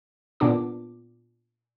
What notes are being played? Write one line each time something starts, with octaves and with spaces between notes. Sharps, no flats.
A#2 B3 D4 D6